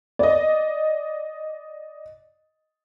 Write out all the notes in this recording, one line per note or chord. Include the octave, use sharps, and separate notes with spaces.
D5 D#5